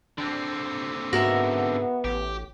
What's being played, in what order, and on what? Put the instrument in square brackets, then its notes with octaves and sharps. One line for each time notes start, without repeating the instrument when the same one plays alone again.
[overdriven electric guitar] D3 C4 [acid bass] D4
[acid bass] G#2 [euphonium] B3 [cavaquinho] F#4 A#4 E5
[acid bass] A1 [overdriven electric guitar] G4